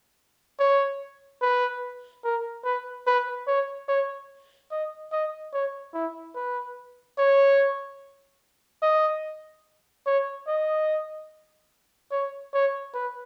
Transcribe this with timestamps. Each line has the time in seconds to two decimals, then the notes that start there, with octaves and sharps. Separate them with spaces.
0.59 C#5
1.42 B4
2.24 A#4
2.64 B4
3.07 B4
3.47 C#5
3.88 C#5
4.71 D#5
5.12 D#5
5.53 C#5
5.94 E4
6.35 B4
7.18 C#5
8.82 D#5
10.06 C#5
10.47 D#5
12.11 C#5
12.53 C#5
12.94 B4